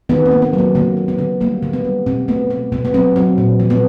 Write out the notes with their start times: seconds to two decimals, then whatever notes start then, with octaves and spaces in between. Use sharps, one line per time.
0.09 D#3 B3
0.26 C4
0.31 A#3
0.42 B3
0.53 F#3
0.58 A#3
0.75 D3 A#3
0.97 A#3
1.08 B3
1.18 D3
1.41 G3 A#3
1.63 D3
1.73 B3
1.85 G3
2.06 B2 C4
2.28 A3 B3
2.50 B2 B3
2.72 B2 B3
2.85 B3
2.94 F#3 C4
3.16 F#3 C4
3.38 A#2
3.60 F3
3.70 B3